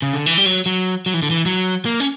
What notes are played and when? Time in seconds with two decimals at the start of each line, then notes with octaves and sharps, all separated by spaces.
0.02 C#3
0.14 D3
0.26 E3
0.38 G3
0.46 F#3
0.66 F#3
1.06 F#3
1.14 E3
1.22 D3
1.30 E3
1.46 F#3
1.86 A#3
2.00 C#4